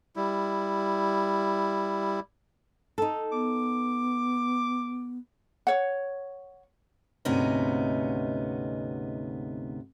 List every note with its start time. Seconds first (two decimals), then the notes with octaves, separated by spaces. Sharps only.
0.16 G3 E4
2.98 D#4 A4
3.32 B3 D6
5.67 C#5 F#5
7.25 D2 G#2 C3 B3 C#4 D#4